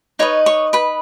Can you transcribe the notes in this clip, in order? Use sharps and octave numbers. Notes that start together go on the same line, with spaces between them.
D#4 B4 C#5 D#5 C#6
C#5 C#6
B4 B5